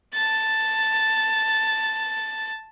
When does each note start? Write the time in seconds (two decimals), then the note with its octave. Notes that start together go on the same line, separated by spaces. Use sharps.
0.14 A5 A6